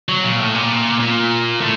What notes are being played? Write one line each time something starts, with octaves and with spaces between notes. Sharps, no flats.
F#3
A#2
A2
A#2
A#2
A2